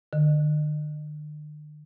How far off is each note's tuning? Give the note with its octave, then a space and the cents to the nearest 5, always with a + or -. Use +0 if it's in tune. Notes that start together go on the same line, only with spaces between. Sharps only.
D3 +45